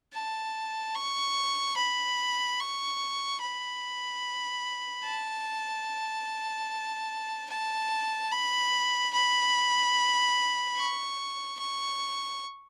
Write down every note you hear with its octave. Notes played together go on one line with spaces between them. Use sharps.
A5
C#6
B5
C#6
B5
A5
A5
B5
B5
C#6
C#6